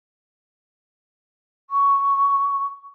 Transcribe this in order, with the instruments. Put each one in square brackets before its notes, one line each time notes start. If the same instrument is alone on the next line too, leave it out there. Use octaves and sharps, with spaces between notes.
[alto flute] C#6